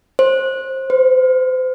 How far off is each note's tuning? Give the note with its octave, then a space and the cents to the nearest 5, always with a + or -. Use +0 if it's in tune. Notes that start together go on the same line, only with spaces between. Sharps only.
C5 +20
C5 -35